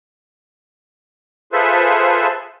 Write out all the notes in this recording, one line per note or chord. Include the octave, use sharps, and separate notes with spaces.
F4 G#4 A4 B4 C5 E5